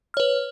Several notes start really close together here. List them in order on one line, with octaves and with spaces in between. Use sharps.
F6 C#5 B4